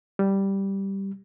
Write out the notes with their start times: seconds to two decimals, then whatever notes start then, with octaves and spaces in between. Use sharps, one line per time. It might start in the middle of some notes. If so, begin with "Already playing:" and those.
0.19 G3